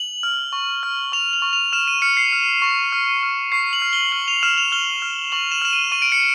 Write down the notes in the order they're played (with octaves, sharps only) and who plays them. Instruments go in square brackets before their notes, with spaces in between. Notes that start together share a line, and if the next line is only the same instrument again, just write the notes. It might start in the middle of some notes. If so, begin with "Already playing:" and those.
Already playing: [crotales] F#7
F6
C#6
F6
C#6 F7
F7
C#6
F7
F6 E7
D#7
F6 C#7
C7
F6
C#6
F6
F6
C#6 C7
F#7
F6
G7
F6 F#7
F7
F6 E7
F7
F6 G7
F6
C#6 F#7
E7
F6 E7
D#7
C#6 D#7
D7
C#7